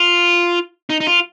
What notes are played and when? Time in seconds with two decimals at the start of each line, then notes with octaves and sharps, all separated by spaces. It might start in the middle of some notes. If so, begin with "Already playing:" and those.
Already playing: F4
0.90 D#4
1.00 D#4
1.07 F4